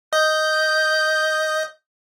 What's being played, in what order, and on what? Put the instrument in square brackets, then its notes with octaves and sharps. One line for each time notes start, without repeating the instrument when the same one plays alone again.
[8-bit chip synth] D#5 [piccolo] G6